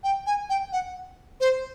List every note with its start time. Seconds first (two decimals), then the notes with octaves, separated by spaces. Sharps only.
0.04 G5
0.27 G#5
0.50 G5
0.73 F#5
1.40 C5